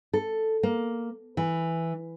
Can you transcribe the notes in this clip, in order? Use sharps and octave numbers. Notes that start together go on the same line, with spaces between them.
A4
A#3
E3